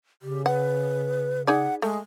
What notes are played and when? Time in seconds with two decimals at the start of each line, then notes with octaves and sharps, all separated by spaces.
0.22 C#3 G4
0.46 B4 F#5
1.47 D#4 G#4 D5 F#5
1.82 G#3 A3